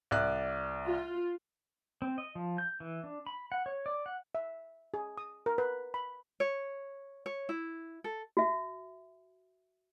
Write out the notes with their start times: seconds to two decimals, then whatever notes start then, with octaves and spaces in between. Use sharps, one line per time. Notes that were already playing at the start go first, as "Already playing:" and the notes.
0.11 C2 D5 F#6
0.85 F4
2.02 C4
2.18 D#5
2.35 F3
2.58 G6
2.80 E3
3.04 D4
3.27 B5
3.52 F#5
3.66 C#5
3.86 D5
4.06 F#5
4.35 E5
4.94 G#4
5.18 D#6
5.46 A#4
5.58 B4
5.94 B5
6.40 C#5
7.26 C#5
7.49 E4
8.04 A4
8.37 F#4 E5